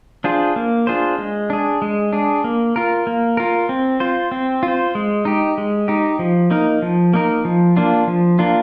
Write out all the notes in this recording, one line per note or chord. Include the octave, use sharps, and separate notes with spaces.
D4 F4 G#4 C5
A#3
D4 F4 G#4 C5
G#3
D4 G#4
G#3
D4 G#4
A#3
F4 A#4
A#3
F4 A#4
C4
F4 C5
C4
F4
C5
G#3
D#4 G4
G#3
D#4 G4
F3
A#3 D#4 A#4
F3
A#3 D#4 A#4
F3
A#3 D4 F4
F3
A#3 D4 F4